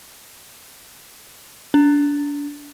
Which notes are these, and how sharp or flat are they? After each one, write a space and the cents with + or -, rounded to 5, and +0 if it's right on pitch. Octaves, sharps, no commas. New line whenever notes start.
D4 -30